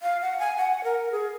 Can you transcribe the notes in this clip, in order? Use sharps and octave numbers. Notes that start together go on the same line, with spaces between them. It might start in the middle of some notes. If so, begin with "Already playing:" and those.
F5
F#5
G#5
F#5
A#4
G#4